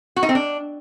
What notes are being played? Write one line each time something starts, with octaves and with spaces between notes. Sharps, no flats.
F#4
D#4
C4
D4